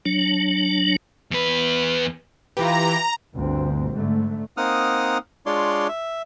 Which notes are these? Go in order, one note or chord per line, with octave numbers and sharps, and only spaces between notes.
F#3 D4
E2 B4
E3 F4 G4 B4 A#5
G1 D2 C4
G#2 D3 A3
A#3 C4 D#4 F#5 D#6 F6
G#3 D4 F4 C#5 D5 C6
E5